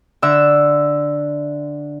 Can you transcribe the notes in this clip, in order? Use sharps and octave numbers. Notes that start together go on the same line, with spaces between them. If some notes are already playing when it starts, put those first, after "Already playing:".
D3 E5 E6